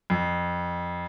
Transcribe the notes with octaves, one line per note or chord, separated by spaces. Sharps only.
F2